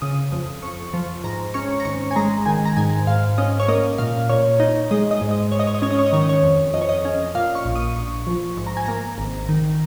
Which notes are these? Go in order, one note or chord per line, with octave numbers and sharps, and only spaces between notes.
C#3 D#6
F2
F2 C#6
F3
G#2 A#5
C#4 C#6
A#5
G#1 C#6
G#5
G#3 A#5
D#3 G#5
A#5
G#2 G#5
G#2 F5
C#4 D#5
C#5
A#3 D#5
A#2 F5
A#2 C#5
D#4
G#3 D#5
D#5
G#2
D#5
G#2 C#5
D#5
C#5
D#5
C#4 C#5
D#5
C#5
D#5
D#3 C#5
D#5
C#5
F2
F2 D#5
C#5
D#5
C#4
A#2 F5
C#6
A#1
D#6
A#1 C#6
F3
G#2 C#6
A#5
G#5
A#3 A#5
G#1
D#3